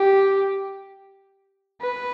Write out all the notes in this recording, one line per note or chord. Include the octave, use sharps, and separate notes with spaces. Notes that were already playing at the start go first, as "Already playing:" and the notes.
Already playing: G4
B4